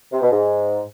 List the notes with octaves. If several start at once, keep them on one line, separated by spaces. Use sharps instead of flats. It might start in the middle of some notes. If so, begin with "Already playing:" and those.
C3
B2
G#2